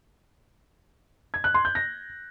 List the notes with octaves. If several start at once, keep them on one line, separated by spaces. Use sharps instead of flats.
G#6
F#6
C6
G6
A#6